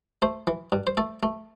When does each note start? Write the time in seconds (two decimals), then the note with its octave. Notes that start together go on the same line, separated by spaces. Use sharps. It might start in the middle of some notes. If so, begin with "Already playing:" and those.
0.22 A3 C5
0.47 E3
0.72 G2
0.87 C5
0.97 A3 A4
1.23 A3